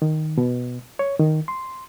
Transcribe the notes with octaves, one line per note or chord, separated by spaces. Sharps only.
D#3
B2
C#5
D#3
C6